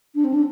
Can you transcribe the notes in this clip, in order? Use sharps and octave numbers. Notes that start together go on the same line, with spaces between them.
D4
C4
D4